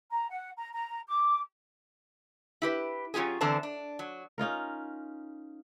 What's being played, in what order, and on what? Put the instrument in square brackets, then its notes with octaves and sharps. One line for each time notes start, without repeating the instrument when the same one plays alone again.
[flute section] A#5
F#5
A#5
A#5
D6
[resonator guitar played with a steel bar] E4 G4 B4
F#3 C#4 F4 G4 G#4
E2 D3 C4 D4 C5 A5
D4
F#3
[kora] C#4 D#4 F4 A#4